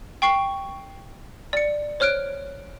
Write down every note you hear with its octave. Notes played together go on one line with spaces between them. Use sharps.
G5 C#6 C7
D5 C#7
C5 C#5 F6 F#6 D7